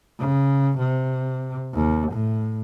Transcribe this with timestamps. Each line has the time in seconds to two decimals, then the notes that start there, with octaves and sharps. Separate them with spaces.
0.19 C#3
0.79 C3
1.74 D#2
2.12 A2